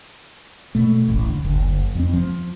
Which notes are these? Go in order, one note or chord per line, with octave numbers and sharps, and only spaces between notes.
B2 A3
D#1 A1
D2
F#1 D2
F2 C4
F3